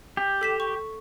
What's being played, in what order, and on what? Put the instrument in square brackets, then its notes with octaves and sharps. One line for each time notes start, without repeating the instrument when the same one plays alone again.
[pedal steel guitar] G4
[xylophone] A4 B6 E7
C#6